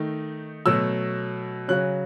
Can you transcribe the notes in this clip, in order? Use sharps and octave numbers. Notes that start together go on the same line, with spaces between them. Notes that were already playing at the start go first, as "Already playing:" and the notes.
Already playing: D#3 A3 D#4
B2 F#3 A3 E6
C#3 F#3 C#4 F#6